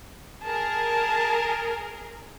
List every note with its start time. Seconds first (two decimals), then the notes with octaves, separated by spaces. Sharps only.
0.43 G#4 A#4 A5